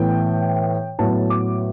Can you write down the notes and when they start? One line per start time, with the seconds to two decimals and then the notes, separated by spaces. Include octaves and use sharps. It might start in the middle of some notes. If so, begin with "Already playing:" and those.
Already playing: A2 E3 B3 G5
0.99 A2 F#3 B3 A5
1.30 D6